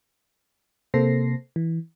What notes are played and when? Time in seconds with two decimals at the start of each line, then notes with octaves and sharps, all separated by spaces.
0.94 C3 A#3 A4 C5 A#6 C7
1.56 E3